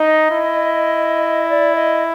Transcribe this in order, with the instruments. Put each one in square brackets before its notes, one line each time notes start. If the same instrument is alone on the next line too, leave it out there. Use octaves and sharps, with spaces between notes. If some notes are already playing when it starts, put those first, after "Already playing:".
Already playing: [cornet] D#4 [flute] D#5
[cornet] E4
[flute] D5
D#5